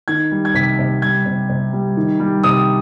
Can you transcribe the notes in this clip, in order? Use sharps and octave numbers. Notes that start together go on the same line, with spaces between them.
D#3 G#6
G3
G#6
C3 B6
C3
G3 G#6
C3
C3
G3
D#3
G3
C3 D#6